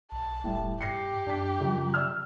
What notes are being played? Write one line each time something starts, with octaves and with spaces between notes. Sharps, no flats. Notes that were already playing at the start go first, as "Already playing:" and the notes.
B1 A5
E1 A2 G3
G2 G4 A#6 C7 C#7
F#2 D4 G5 B6
F#2 C#3 F3 G3
D5 E6 F6